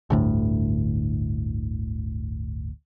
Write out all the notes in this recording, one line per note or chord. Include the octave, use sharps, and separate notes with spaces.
G1 D2 A2